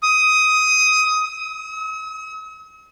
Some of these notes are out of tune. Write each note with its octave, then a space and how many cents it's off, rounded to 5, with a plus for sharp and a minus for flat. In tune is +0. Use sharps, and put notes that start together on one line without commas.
D#6 +15
D#6 +45